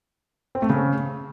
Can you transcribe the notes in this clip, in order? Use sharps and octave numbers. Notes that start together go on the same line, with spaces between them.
C4
A3
C#3